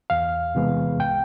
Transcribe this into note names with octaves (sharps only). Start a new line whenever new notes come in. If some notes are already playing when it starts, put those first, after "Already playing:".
E2 F5
C3 E3 G#3 B3
C2 G5